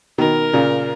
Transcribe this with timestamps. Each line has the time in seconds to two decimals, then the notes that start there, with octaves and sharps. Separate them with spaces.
0.18 B2 D#3 A#4
0.53 A#2 C#3